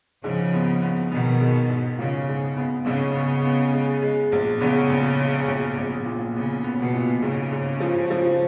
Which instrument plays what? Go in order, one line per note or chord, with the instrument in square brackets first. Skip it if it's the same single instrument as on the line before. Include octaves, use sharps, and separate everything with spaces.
[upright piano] G#2 [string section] C#3 F3
[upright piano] B3
B3
[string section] B2 D#3 [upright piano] B3
[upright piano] G#2
G#2
[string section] C#3 [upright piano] F4
[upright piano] G#2
B3
[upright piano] G#2 [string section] C#3
[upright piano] B3
B3
G#3
G#3
A#1
[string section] C#3 [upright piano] B3
[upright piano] A#1
G#3
A#1
A#1
A#2
[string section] C#3 [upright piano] B3
[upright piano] B3
[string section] B2
[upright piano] A#2
[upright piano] G#2 [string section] C#3
[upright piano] G#2
F3
F3